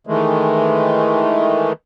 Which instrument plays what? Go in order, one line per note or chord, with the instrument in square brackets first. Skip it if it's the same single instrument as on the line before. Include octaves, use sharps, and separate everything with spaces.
[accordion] D#3 E3 G#3 A3